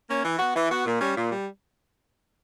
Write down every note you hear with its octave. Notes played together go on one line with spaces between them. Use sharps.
A#3 C#4
E3
B3 F#4
E3
B3 F#4
A#2
G3 C#4
A#2
G3